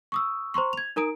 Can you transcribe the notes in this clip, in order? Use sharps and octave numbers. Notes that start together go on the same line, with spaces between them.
C#6 D#6 E6
C5 A#5 C6 C#6
G#6 F7
D#4 A#4 A#5 D#6 D7